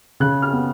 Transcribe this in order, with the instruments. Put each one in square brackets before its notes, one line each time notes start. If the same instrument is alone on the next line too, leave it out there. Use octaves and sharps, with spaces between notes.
[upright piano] C#3 F#6
F6
B3